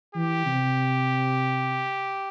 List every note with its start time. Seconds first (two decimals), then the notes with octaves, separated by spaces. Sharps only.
0.15 E3 G4
0.46 C3